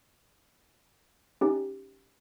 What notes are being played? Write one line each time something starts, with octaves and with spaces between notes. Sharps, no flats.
C#4 D#4 G4